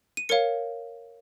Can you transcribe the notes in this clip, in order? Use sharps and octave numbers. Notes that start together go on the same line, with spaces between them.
D#7
A#4 C#5 F5 C#7